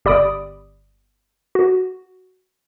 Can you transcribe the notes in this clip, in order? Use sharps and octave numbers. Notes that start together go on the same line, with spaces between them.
G1 G4 D5 B5 D#6 D7
F#4